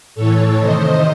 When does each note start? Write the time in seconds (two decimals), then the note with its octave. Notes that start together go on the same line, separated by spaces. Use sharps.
0.15 A2 E3 A4 C#5
0.59 C3 D#3 C5 D#5